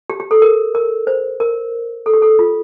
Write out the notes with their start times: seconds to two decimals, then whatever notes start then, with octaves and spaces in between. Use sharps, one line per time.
0.10 G4
0.20 G4
0.31 A4
0.42 A#4
0.75 A#4
1.07 C5
1.40 A#4
2.06 A4
2.13 G4
2.22 A4
2.39 F4